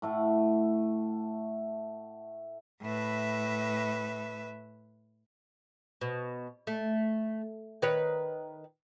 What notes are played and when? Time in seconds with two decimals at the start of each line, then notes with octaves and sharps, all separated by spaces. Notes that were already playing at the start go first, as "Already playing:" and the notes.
0.02 A2 A3 F#5
2.82 A2 B4 E5
6.01 B2
6.67 A3
7.82 D#3 B4 C#5